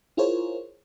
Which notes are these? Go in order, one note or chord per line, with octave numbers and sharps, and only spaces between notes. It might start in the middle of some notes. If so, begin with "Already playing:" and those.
E4 F4 G#4 A#4 C5 C#5